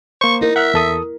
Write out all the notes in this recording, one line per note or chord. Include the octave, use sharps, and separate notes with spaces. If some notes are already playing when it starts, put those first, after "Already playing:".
A#3 C5 C#6
D#4 E4 A#4
E5 F#5 F6 F#6
E2 A4 D#6